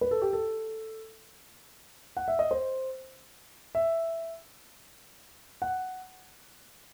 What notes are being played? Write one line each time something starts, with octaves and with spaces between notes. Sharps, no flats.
B4
A4
G4
A4
F#5
E5
D#5
C5
E5
F#5